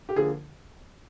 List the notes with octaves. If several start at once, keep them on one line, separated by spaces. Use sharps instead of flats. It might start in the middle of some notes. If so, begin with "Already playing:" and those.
G4
D3 F3 A#3 G#4